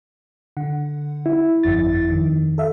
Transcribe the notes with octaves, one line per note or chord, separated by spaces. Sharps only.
D3 F#5
E4
G1 F2 A6
F2 D#3
A4 E5 F5